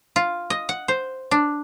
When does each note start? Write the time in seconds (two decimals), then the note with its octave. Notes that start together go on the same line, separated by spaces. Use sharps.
0.16 F4
0.50 D#5
0.69 F#5
0.88 C5
1.31 D4